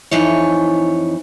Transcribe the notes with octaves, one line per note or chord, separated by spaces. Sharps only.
F2 E3 D#4 C#5